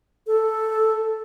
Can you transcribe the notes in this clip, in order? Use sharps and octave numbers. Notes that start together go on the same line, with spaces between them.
A4